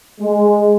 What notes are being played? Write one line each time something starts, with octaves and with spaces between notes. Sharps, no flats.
G#3